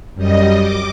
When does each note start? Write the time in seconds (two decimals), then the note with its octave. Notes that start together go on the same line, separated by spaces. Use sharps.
0.14 F#2 G3 D#5
0.59 D6